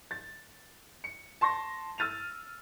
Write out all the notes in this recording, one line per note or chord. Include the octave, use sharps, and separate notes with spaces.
A6
C#7
A5 C6 C#6 A#6
E6 F6 A6 D#7 F7